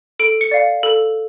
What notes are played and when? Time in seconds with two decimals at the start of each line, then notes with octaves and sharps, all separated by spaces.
0.19 A4 D7
0.41 C#7
0.51 D5 F5
0.83 A4